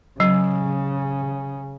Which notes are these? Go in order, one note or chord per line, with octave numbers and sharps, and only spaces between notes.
C#3 F#3